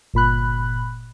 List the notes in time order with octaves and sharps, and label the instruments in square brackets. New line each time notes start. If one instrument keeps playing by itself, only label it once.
[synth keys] G1 A#2 B5 F#6